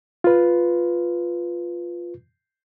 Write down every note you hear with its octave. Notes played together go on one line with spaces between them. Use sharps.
F4 B4